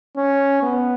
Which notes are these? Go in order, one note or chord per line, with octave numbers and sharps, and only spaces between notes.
C#4
B3